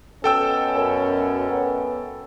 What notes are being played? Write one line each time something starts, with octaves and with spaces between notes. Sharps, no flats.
B2 C#4 A4 G5 E6
F#2
B3